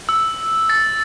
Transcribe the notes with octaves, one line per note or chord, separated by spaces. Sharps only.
E6
A6